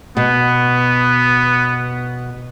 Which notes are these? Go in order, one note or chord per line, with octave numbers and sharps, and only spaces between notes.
B2 B3